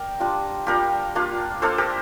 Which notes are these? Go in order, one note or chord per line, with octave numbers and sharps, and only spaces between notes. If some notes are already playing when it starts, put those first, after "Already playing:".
Already playing: A#4 D5 G5
G3 D4 F4
G3 D4 F4 G4 A#4
A#3 D4 F4
A#3 D4 F4 A4 C5
G4 A#4